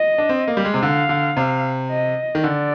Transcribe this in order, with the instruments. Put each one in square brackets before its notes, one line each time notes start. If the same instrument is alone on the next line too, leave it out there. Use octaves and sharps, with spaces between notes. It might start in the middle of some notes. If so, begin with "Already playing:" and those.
Already playing: [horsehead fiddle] D#5
[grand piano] D4
C4
A#3
G3
G#3
C3
[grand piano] D3 [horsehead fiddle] F5
[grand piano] D3
C3
[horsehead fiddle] D#5
[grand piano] D#3
[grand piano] D3 [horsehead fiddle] D5